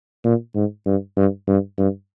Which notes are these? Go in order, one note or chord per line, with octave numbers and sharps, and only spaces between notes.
A#2
G#2
G2
G2
G2
G2